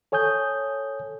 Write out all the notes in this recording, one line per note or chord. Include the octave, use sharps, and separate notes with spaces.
A4 C#5 G#5 D#6 G6